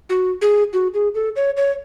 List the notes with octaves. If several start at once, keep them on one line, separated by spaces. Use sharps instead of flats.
F#4
G#4
F#4
G#4
A4
C#5
C#5